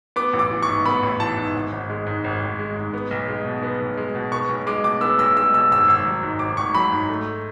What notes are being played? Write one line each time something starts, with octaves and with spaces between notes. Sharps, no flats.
B3 D6
A1
D6
E3
C#6
G#2
B3 B5
A1
E3 A5
G#2
G#1
G#1
G#3
G#2
G#1
G#1
G#3
G#2
B3
B1
G#3
B2
B3
B1
G#3
B2
B3 C#6
B1
G#3 D6
B2 D6
B3 E6
B1 E6
G#3 E6
B2 E6
G#1 E6
G#1 E6
F#3
G#2
G#1 D6
G#1 C#6
F#3 B5
G#2
A3